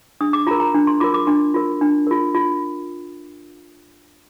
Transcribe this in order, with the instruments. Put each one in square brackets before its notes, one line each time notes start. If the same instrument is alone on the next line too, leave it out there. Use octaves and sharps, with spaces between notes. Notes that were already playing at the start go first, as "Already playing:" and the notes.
[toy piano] D4 D#6
D6
F4 A#5
A#4
A#5
D4
C6
F4 A#4 D6
D6
D4 C6
F4 A#4
D4
F4 A#4
F4